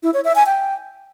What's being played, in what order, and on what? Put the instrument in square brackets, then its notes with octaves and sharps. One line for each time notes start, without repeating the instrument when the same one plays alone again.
[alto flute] E4
C#5
E5
G#5
G5